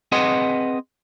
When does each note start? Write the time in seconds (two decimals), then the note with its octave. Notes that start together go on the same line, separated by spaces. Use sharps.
0.12 C4 G#4 B4 D#5 F#5 C6